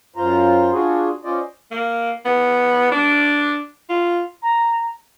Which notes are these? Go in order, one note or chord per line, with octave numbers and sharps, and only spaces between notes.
F#2 F4 C5 A#5
D4 F4 F#4 G#4
C#4 F4 C5 D5 D#5
A#3
B3
D4
F4
A#5